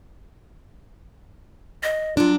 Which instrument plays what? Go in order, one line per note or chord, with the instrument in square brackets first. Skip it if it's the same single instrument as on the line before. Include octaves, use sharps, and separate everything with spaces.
[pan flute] D#5
[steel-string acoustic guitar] F#3 D4 [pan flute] F4